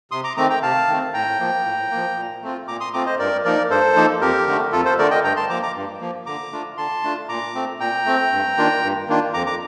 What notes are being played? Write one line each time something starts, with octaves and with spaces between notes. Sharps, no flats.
C3 C6 D#6
A#5 D6
D#3 A3 C4 A#5 D6
G5 A#5
C3 F5 A5
D#3 A3 C4
A2 G5 A#5
F3 A#3
A2
F3 A#3
A#2
A3 C4 F4
A#2 A#5 D6
C6 D#6
A3 C4 F4 A#5 D6
C5 D#5
G2 A#4 D5
F3 A#3 D#4 A#4 D5
G2 A4 C5
F3 A#3 D#4
F2 G4 A#4
D3 A3
F2 F4 A4
A4 C5
D3 A3 A#4 D5
D#5 G5
G2 G5 A#5
A5 C6
F3 A#3 A#5 D6
A#5 D6
G2
F3 A#3
D3 A#5 D6
A3 D4 F4
D3 A5 C6
A3 D4 F4
A#2 A#5 D6
A3 C4
A#2 G5 A#5
A3 C4
G2
D#3 A#3 D4 F4
G2
D#3 A#3 D4 F4
F2 A#5 D6
A#5 D6